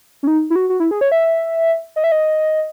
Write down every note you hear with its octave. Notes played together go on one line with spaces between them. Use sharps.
C#4
D#4
E4
F#4
F#4
E4
G#4
C#5
E5
D#5
E5
D#5